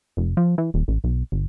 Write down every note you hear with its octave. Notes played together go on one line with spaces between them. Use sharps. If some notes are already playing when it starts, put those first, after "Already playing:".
F1
F3
E3
D#1
A1
B1
G1